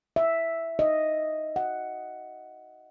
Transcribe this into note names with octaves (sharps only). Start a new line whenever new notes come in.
E5
D#5
F#5